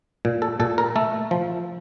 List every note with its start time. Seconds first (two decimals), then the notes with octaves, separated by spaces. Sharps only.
0.25 A#2
0.42 A4
0.60 A#2 A4
0.78 A#4
0.96 A3 A4
1.31 F3